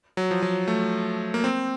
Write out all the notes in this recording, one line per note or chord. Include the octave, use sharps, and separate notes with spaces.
F#3
F3
F#3
A3
A#3
C4